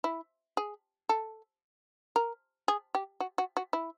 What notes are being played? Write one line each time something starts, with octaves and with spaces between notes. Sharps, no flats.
E4
G#4
A4
A#4
G#4
G4
F#4
F#4
F#4
E4